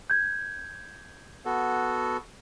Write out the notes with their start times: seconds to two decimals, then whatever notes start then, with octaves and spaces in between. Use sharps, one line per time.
0.10 G6 G#6
1.45 B3 F#4 A4